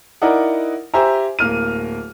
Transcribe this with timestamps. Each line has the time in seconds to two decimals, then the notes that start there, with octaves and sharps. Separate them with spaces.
0.22 D#4 E4 A#4 D5 D#5 F#5
0.94 G4 C5 E5 G#5 A#5
1.39 D1 A#3 F6 D#7